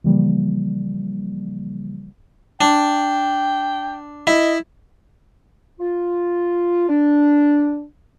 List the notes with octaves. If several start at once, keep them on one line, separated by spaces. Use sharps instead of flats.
C#3 E3 F3 G3 A#3
D4 G5
E4 D#5
F4
D4